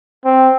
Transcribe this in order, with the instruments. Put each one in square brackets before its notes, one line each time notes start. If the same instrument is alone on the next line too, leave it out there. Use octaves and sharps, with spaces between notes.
[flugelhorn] C4